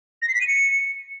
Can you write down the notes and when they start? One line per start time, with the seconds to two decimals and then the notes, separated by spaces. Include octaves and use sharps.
0.22 A#6
0.28 C7
0.35 B6
0.41 D#7
0.47 C#7